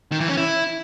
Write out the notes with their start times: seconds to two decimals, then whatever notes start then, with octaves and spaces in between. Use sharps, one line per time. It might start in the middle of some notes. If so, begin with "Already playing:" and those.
0.12 D#3
0.20 E3
0.29 C#4
0.37 E4